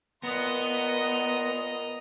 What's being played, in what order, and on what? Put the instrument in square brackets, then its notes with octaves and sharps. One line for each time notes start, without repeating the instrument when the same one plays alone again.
[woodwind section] A#2 C6 D#6 [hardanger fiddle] A#3 D#5 [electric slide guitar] B3 [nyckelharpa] A#5